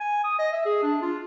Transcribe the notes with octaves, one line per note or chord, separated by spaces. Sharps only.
G#5
D#6
D#5
E5
G#4
D4
F4